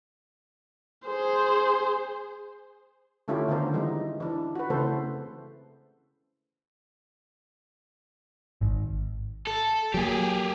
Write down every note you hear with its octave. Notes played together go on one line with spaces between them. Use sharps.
G#4 C5
D3 A3 C#4 E4 F4 G4
D3 D#3 B3 D4 A#4 C5
E3 G3 G#3 D#4
E3 D4
F#4 B4
C#3 E3 A3 C4 A4 C5
G#1
A4
F#3 A#3 G4 G#4